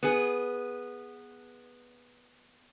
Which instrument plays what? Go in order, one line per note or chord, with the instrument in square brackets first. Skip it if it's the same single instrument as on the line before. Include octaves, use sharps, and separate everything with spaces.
[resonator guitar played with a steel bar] B3 G#4